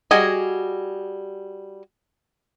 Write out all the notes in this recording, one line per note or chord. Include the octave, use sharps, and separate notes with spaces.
G3 F#4 G#4 D#5 G#5